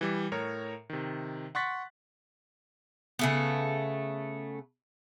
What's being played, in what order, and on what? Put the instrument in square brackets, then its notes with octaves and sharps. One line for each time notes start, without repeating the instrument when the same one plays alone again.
[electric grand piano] E3 G3
A2 A#4 C#5 A#5
C3 D#3
F#5 C6 C#6 F#6 A6 B6
[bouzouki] C#3 A3 B3